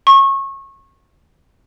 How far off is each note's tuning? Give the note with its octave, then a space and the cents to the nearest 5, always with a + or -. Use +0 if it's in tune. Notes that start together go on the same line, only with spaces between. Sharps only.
C#6 -25